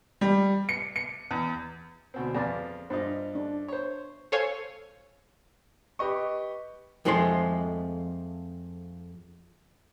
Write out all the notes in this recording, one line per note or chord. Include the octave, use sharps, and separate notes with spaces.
G3
C#7
C#7
E2
D2 B2 C4
F2 G#4 B4 D5 F5 A5
G2 F4 C5 D#5
D4
C5 C#5
A4 C5 C#5 F5 G#5
G4 B4 D#5 C#6
F2 F3 G#3 A3 G#4 C6